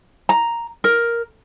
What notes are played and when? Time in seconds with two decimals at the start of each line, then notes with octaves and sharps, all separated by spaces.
0.29 A#5
0.84 A#4